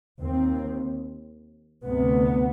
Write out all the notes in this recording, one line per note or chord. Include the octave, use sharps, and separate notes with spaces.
D#2 C4
D2 C3 B3